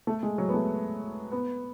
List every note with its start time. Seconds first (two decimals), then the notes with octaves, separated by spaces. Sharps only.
0.07 A3
0.23 G#3
0.38 F#3
0.49 B3
0.54 A3
1.32 B3